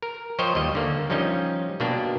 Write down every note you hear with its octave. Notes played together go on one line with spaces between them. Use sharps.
A#4
F3 C5 C#5 D#5 G5
D#2 G3 D#5
D3 A#3
F3 G3 C#4 D#4 D#5
B2 A#3 D4 G4